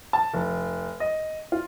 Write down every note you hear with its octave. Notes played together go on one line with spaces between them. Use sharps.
A5
F1
D#5
F4